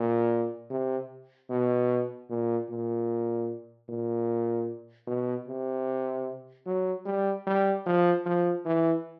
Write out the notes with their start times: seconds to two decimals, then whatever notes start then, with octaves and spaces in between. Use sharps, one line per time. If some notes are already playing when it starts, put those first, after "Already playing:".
Already playing: A#2
0.70 C3
1.50 B2
2.30 A#2
2.69 A#2
3.89 A#2
5.07 B2
5.48 C3
6.66 F#3
7.06 G3
7.47 G3
7.86 F3
8.26 F3
8.65 E3